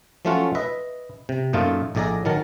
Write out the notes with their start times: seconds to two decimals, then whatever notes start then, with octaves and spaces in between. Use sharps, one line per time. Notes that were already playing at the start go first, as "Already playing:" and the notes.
0.25 F3 F#3 A3 C#4 F4 F#4
0.55 B4 D#5 E5
1.29 C3
1.53 F#2 A#2 A3 D#4 F4
1.95 A#1 A2 G#4 D5 D#5 A#5
2.25 D#3 F#3 A#4 A5